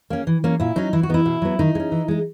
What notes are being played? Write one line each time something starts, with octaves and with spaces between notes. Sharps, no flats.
A#3 C#4
E3
A#3 C#4
A#2 E4
F#3 C#4 D#4
E3 E4
F#4
B3 D#4 E4
B2
F#3 B3
D#3 D#4
G#3
C#4
E3
G#3 D#4